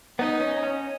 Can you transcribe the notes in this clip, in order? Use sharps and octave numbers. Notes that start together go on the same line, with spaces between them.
B3 D#4
C#4
C#4